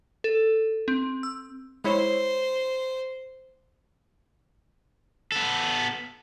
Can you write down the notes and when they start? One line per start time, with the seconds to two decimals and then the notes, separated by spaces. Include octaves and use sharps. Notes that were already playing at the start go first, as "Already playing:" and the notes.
0.24 A4
0.88 C4
1.23 E6
1.84 G#3 E4 C5 C#5
5.32 B3 A4